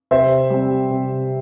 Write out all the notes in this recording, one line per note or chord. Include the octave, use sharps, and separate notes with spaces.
C3 C5 E5
G3 C4
C3